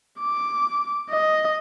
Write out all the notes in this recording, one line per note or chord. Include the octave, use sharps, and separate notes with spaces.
D6
D#5